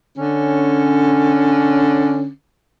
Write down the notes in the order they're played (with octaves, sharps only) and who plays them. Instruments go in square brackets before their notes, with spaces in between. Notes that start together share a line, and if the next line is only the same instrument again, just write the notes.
[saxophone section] D3 C#4